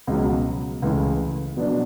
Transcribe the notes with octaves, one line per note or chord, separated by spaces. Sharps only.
C#2 B2 F#3
C#2 C#3 E3 A3
B2 F#3 B3 D4